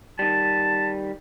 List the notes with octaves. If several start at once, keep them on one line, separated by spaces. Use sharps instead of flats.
D#3 G3 A5